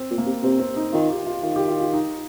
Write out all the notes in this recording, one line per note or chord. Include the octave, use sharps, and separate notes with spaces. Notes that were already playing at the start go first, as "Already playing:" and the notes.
Already playing: C4
A#2
A#3
C3
C3 C4
C4
D#4
D#3 F4
G4
F4
D#3 F4
G4
F4
F4
D#4